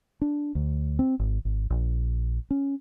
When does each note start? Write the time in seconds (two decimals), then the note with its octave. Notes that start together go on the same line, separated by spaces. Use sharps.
0.22 D4
0.55 D2
0.99 C4
1.19 G#1
1.45 G#1
1.70 A#1
2.51 C#4